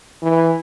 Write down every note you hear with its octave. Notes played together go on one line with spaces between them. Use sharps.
E3